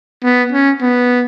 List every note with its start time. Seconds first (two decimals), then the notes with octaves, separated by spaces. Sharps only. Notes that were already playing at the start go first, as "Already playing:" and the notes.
0.23 B3
0.52 C#4
0.81 B3